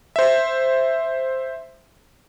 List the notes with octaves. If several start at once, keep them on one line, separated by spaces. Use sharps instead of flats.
C5 E5